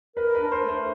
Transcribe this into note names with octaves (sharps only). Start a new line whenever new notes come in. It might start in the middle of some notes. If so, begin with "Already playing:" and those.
A#4 B4
D4 B4
C5
A3
C5